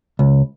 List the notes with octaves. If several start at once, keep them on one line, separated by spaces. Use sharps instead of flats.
C#2